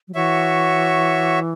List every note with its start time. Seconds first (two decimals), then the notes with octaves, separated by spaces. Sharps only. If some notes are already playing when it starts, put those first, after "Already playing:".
0.08 F#3
0.14 E3 F#4 C#5 E5